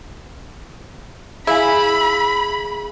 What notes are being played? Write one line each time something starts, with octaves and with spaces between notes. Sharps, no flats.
E4 G#4 F5 G#5 B5